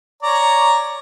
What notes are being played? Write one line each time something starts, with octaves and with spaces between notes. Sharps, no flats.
C#5 D5 A#5